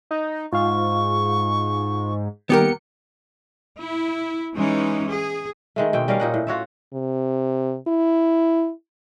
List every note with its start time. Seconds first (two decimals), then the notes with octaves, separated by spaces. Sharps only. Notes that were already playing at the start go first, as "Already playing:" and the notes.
0.11 D#4
0.53 G#2 F4 F5 C#6
2.50 D#3 G3 A#3 B3 G4 A#4 C#7
3.79 E4
4.54 E3 G#3 C#4 D#4
5.10 G#4
5.76 D#3 G#3 A3
5.93 B2 C4 G5
6.08 G3 C#4 A#4 F5
6.20 A#2 D#4 F#5
6.34 A2
6.47 F4 F#4 C#5 E5
6.93 C3
7.88 E4